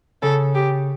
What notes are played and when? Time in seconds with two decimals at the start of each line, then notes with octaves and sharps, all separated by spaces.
0.22 C#3 A4
0.55 G4